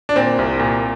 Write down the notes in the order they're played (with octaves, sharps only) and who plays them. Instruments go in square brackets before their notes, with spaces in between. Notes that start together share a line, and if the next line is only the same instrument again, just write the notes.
[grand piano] D4
A#2 C4
C2
A#2